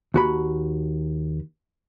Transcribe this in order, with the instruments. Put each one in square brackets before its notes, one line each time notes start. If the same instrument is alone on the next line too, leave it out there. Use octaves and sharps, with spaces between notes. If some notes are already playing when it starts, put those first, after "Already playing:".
[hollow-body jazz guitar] D#2 F#4 B5